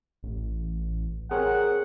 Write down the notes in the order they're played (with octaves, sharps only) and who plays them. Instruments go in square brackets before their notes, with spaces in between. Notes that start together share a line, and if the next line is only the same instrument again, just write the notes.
[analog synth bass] A1
[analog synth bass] C4 [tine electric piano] G#4 A#4 C#5 [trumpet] F#5